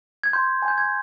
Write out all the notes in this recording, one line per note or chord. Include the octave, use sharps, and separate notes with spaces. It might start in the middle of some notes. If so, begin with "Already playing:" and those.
G#6
C6 G6
G#5
G6
G#6